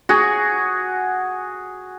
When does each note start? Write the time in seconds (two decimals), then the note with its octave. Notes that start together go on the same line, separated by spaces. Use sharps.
0.09 F#4 G#4